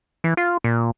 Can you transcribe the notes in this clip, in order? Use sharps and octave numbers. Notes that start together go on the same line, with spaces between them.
E3
F4
A#2